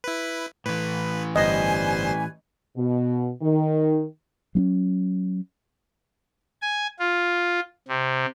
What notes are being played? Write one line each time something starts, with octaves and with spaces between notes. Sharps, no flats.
E4 B4
A2 E3 B4
G1 G3 B4 C5 D#5 G#5 C6
B2
D#3
F#3 C4 C#4
G#5
F4
C3